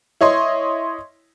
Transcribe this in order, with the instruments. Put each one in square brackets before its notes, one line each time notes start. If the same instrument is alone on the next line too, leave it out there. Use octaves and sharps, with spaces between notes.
[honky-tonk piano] E4 C#5 D#5 C6